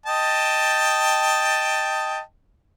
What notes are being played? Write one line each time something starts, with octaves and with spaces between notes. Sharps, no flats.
D#5 G5 A5